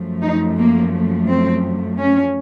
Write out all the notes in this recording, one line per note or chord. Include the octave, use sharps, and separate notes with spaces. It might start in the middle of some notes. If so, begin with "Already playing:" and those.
Already playing: F#2 F3 A3
D#4
A#3
C4
C#4